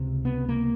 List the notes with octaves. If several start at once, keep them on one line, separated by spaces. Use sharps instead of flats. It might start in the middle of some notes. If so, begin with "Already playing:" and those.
Already playing: C#2 C3
B3
A#3